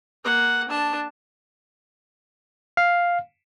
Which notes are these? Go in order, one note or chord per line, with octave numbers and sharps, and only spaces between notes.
A#3 F#5
D4 A5
F5